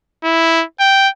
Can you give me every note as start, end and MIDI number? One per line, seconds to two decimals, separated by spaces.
0.24 0.64 64
0.80 1.08 79